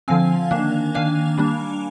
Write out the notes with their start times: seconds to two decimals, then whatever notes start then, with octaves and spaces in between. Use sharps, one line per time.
0.08 D3 F3 C4 F5 G#5
0.51 D#3 A#3 D4
0.95 D#3 A#3 D4 F5 G#5
1.38 G3 A#3 D4